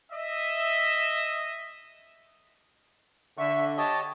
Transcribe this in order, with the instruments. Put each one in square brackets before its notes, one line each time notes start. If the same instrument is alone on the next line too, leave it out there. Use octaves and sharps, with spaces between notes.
[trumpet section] D#5 E5
[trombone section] D3 [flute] E5 [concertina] C#6
[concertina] G4 C#5 D#5 [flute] A5